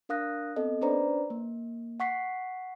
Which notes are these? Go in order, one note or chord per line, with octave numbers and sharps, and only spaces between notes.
D4 A#4 F5 D#6 F#6 A#6
B3 C4 A4 D#5
C#4 D4 B4 C5 D5 A#5
A#3
F#5 C#6 B6 C7